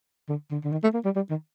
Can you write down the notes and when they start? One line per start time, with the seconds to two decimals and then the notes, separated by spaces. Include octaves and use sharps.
0.29 D3
0.51 D3
0.64 D3
0.72 D#3
0.83 A3
0.94 A#3
1.05 G3
1.16 G3
1.30 D#3